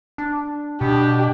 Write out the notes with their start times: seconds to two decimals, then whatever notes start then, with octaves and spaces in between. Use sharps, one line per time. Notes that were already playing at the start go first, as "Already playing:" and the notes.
0.18 D4
0.81 B2 D4 G4